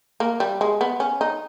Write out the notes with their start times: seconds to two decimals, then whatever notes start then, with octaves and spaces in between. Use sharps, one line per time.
0.20 A#3
0.40 G3
0.61 G#3
0.81 B3
1.00 C#4
1.21 D#4